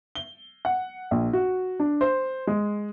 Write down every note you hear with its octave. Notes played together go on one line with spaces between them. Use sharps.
G7
F#5
A#1
F#4
D4
C5
G#3